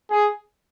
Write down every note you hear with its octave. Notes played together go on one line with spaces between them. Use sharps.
G#4